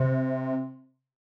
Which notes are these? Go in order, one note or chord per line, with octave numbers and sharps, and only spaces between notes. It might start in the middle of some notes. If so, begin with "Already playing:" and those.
Already playing: C3